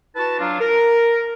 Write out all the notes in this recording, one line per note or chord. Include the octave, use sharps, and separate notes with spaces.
E4 F#4 B4 A5
F#3 D4 F4
A#4